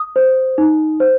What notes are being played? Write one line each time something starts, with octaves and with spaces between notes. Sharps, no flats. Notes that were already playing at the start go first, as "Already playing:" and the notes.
Already playing: D#6
C5
D#4
C5